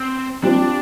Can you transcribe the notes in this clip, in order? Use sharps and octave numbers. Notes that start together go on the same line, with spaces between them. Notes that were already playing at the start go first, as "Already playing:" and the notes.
Already playing: C4
G3 C4 D4 F4 C5